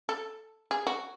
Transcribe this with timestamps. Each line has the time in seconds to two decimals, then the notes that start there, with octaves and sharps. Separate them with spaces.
0.09 A4
0.71 G#4
0.87 F#4